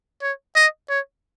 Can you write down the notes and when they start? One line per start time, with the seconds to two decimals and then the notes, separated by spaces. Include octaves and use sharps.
0.22 C#5
0.56 D#5
0.89 C#5